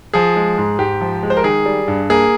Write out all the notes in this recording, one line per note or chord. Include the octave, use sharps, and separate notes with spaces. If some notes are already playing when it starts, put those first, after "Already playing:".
F3 G#4
G#3
G#2
G#2 G4
F3
G#3
C5
A#4
D#3 G#4
G3
G2
A#3 G#4